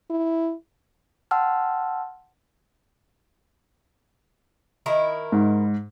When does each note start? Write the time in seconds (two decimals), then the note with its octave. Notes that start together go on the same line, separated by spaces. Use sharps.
0.10 E4
1.31 F#5 G5 A5 C6 E6 F6
4.86 D#3 E4 A#4
5.32 G#2